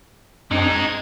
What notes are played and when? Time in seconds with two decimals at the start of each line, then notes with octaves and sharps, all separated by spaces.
0.51 F#2 G#3 C4 D4 D#4
0.74 G#6